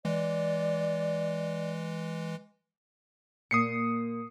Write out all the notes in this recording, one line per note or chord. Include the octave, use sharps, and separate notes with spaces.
E3 G#3 D5
A#2 A#3 D#6 C7 C#7